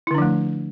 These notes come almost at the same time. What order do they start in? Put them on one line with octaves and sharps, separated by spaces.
E4 D3 D4 F3 A3